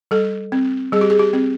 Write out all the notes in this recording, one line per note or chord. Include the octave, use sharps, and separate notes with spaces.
G3 A4
C4
G3 G#4
G4
G#4
G4
C4